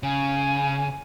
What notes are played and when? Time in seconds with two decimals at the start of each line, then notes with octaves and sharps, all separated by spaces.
0.03 C#3 G#5